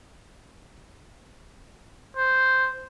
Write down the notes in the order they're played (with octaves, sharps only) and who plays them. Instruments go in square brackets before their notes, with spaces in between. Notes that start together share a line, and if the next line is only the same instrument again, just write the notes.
[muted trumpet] C5